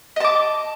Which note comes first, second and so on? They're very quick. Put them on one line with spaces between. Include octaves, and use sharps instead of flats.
D#5 A5 D6